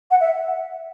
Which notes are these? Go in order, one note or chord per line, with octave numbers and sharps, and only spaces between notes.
F#5
E5